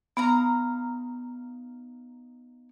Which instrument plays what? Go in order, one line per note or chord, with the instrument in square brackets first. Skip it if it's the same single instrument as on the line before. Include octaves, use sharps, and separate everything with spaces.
[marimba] B3 [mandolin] D#4 F5 A#5